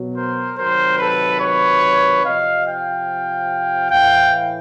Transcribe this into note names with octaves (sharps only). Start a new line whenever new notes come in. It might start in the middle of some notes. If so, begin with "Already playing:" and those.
Already playing: B2 F#3
A#4 C5
C3 D#3 F#3 A#4 C5
A4 B4
B4 C#5
C3 F3 D#5 F5
F5 G5
A2 E3 F5 G5